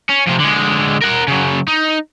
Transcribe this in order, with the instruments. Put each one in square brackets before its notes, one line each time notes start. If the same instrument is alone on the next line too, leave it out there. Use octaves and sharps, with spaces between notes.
[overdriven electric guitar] C#4
F2 C3
D3 G#3
A#4 F#5
C#3 F#3
D#4